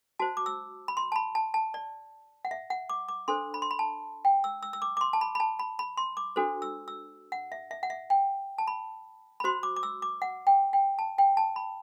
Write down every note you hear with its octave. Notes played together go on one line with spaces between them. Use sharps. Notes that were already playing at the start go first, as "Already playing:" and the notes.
F#4 C5 A5
D6
E6
B5
C6
A5
B5
A5
A5
D5
F#5
E5
F#5
D6
D6
D4 A4 C5 C6
B5
C6
B5
A5
G5
E6
E6
E6
D6
D6
C6
A5
B5
B5
A5
B5
B5
C6
D6
D4 F#4 A4 C5
E6
E6
F#5
E5
E5
F#5
E5
G5
A5
B5
B5
F#4 C5 C6
D6
D6
E6
D6
F#5
G5
G5
A5
G5
A5
B5